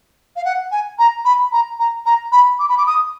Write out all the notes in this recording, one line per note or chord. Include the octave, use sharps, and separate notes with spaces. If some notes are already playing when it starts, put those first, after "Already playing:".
F5
F#5
G#5
A#5
B5
A#5
A#5
A#5
B5
D6
B5
D6
D#6